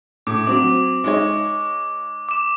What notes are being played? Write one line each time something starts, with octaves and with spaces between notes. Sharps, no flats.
A2 D6
F#3 C4 D6
G#3 D#4 C#5
D6 E7